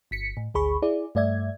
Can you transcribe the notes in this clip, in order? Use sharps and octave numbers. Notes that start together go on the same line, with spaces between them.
G1 B6 C#7
A2
G#1 D2 G#4 B5 C#6
E4 G#4 D5
G2 A3 D5 E5 G#6